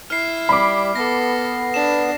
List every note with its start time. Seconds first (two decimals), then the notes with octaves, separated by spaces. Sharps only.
0.10 E4 F6 C7
0.49 G3 B5 D6
0.95 B3 A4 A#6
1.74 D4 E7